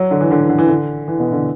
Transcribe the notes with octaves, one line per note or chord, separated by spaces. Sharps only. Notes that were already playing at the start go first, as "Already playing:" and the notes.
Already playing: F#3
D3
E3
D3
E3
D3
E3
D3
E3
B2
D3